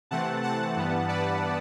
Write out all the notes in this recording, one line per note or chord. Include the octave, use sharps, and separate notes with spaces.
C3 E3 A3 C4 F#5 A5
F#5 A5
G2 E3 G3 B3
B4 D5